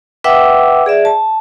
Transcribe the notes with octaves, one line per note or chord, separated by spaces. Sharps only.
B4 E5 F#5 G5 D6 E6
G#4 D5 E5
A5